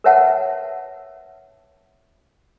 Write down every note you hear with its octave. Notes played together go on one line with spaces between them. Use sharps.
A#4 B4 C#5 E5 F#5 A5